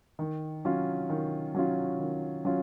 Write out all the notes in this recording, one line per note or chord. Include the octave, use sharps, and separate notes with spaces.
D#3
F#3 C#4 F4
D#3
F#3 C#4 F4
D#3
F#3 C#4 F4